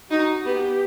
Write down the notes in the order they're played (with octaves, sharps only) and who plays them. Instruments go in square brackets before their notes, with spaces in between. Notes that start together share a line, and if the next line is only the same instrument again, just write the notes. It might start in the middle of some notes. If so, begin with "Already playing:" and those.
[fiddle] D#4 [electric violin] F#4
[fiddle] B3 [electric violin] G4